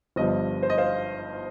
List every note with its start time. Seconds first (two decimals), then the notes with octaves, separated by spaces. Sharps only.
0.16 G1 G2 F3 D#5
0.63 C5
0.70 D#5
0.78 C5 F5